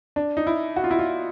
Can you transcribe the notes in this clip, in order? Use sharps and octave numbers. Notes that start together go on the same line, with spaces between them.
D4
D#4
E4
F#4
F4
E4
F4